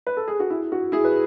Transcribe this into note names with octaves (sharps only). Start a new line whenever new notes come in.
B4
A4
G#4
F#4
E4
F#4
E4 G#4
B4